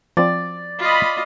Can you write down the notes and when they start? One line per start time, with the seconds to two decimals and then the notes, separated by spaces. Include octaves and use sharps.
0.17 F3 C4 D5
0.79 F4 D#5 B5